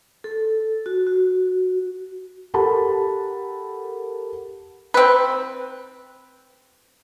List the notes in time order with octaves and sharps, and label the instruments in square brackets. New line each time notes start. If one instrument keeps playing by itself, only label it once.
[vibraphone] A4
F#4
F#4
[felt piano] G4 A4 A#4 F#5 A5 B5
[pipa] C4 B4